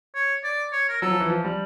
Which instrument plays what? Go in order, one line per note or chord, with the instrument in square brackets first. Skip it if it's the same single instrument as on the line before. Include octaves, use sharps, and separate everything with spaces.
[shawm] C#5
D5
C#5
A#4
[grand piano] F#3 [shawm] A4
[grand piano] F3
E3
F3
G3